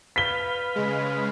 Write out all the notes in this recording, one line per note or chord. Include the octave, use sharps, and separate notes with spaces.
B4 F5 B6 G7
C#3 G#3